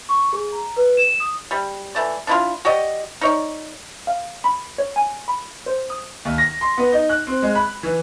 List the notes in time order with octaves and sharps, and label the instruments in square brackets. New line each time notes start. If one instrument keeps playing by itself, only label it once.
[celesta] C#6
G#4
A#5
B4
E7
D#6
[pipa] G3
E3 A3 D5
D4 E4 F4
F#4 G4 D5 D#5
D#4 C#5 D5
[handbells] F5
B5
C#5
G#5
B5
C5
D#6
[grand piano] D#2
A#6
C6
B3
D#4
F#6
C4
G#3
B5
E3